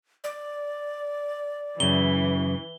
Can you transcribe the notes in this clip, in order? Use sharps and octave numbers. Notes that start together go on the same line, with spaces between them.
D5
F#2 C#3 E3 G7